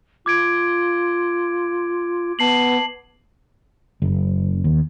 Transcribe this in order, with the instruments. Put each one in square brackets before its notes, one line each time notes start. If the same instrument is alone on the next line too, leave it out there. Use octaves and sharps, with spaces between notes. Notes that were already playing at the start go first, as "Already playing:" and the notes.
[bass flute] F4 [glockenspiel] D6 G#6 D7
[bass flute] B3 [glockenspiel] A5 C7 F#7
[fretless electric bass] F#1
D#2